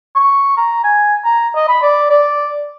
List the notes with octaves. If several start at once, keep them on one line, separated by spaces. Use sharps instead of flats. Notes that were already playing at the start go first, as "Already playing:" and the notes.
C#6
A#5
G#5
A#5
D#5
B5
D5
D5